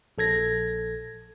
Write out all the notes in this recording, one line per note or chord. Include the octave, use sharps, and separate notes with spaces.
A#1 A4 G#6 A#6